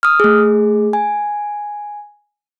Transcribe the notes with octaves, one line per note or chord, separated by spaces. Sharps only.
D#6 F6
A3 G#4
G#5